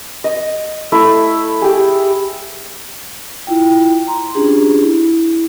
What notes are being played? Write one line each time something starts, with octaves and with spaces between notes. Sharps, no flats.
D#5
A3 E4
G4 G#4
E4 F4 G5
A#5 C6
C#4 D4 F4 G4 G#4
E4